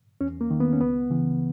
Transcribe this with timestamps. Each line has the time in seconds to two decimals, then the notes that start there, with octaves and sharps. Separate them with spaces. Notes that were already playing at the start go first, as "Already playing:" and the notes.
0.21 E2 C#4
0.41 A#3
0.51 D#3
0.60 B3
0.73 C#4
0.81 C#2 B3
1.10 C#3 E3